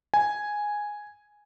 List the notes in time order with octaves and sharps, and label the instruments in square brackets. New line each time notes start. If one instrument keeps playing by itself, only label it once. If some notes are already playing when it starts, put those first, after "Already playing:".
[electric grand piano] G#5